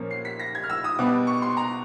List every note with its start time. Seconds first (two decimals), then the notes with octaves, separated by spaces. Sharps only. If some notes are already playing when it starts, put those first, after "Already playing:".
Already playing: A#2 F3 A#3 C#4
0.11 C7
0.25 B6
0.40 A#6
0.55 G#6
0.64 F6
0.70 E6
0.84 D#6
0.99 B2 G3 B3 D4 D6
1.27 C#6
1.42 C6
1.57 A#5